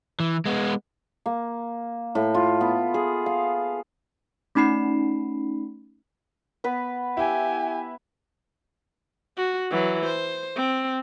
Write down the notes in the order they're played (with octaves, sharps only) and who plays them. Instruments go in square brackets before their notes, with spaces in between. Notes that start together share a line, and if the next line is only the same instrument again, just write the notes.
[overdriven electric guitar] E3
G#3 B3
[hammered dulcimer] A#3
A2
F4
B3
G#4
F5
[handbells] A3 C#4 D#4 B5 C7
[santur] B3 B4 B5
[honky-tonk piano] E4 [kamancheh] G4 G#5
[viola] F#4
E3 F#3
C5
C4